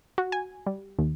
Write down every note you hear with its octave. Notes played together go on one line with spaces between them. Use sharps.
F#4
G#5
G3
D#2